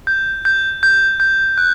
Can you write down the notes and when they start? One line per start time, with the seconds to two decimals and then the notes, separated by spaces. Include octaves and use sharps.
0.07 G6
0.45 G6
0.83 G6
1.20 G6
1.58 F#6